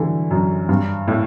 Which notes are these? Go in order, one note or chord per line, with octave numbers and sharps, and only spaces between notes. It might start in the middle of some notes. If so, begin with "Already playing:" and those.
Already playing: D3 E3 F#3 G3
F#2
G2
A2